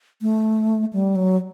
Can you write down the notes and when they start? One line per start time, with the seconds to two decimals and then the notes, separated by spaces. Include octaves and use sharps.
0.22 A3
0.93 G3
1.16 F#3